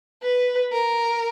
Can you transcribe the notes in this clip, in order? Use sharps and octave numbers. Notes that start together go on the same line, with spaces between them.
B4
A#4